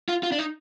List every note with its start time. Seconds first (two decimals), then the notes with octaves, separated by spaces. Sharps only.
0.09 F4
0.23 F4
0.32 D4
0.39 D#4